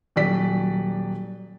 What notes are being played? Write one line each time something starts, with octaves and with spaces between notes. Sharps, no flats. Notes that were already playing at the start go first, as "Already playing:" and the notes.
D#1 F#3 D5 B6